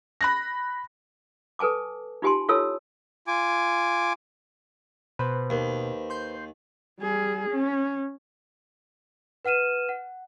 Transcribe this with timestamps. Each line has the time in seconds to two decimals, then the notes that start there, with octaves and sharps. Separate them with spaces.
0.21 B5 F#6 A#6
1.59 A4 B4 G#5 A5 D6
2.22 D#4 F4 G4 G#5 A5 C6
2.49 E4 F4 A4 C#5 A5 E6
3.27 F4 G#5 D6
5.19 B2 B4 C5
5.50 D#2
6.10 C6 G6 C7
7.00 G3 G#4
7.50 C#4
9.45 B4 F#5 F6 D#7 E7
9.89 F#5